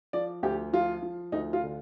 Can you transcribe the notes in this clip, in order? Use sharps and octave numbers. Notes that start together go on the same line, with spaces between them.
F3 D5
D2 G4
F3 F4
F3
D2 D#4
F4
D3